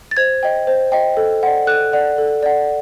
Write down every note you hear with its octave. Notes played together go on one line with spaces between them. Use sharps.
A6
C5 G#6
D#5 G5
C5
D#5 G5
A4
D5 F#5
A4 F#6
D5 F#5
A4
D5 F#5